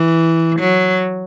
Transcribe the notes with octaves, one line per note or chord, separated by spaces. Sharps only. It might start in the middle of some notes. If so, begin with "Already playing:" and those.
Already playing: E3
F#3